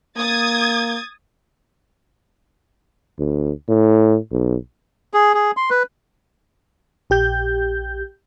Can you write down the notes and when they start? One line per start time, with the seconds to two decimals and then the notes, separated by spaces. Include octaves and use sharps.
0.17 A#3 D#6 G#6 A6
3.19 D2
3.68 A2
4.32 B1
5.14 G#4
5.34 G#4
5.57 C6
5.70 B4
7.10 A#1 G4 G6